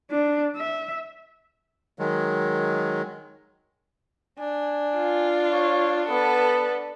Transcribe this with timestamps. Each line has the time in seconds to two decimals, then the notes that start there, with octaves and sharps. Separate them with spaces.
0.11 D4
0.57 E5
1.99 D#3 F#3 G#3
4.39 D4 G#5
4.97 F4
5.52 C#5
6.10 B3 A4 B4